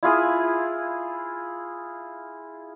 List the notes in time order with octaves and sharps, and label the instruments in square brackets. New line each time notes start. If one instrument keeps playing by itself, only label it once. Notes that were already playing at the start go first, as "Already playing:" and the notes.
[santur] E4 F4 G#4 D#6